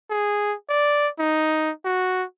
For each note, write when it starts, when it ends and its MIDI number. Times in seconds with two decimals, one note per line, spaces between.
0.10 0.55 68
0.69 1.08 74
1.19 1.71 63
1.85 2.24 66